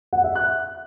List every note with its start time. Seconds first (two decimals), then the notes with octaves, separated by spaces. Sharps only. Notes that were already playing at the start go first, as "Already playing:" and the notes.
0.13 F#5
0.24 E5
0.35 F#6